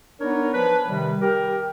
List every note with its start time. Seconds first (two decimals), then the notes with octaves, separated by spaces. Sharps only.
0.21 B3 D4 D#4 A#4 C#5
0.54 F3 B4
0.89 C3 D#3 G3
1.21 G4 A#4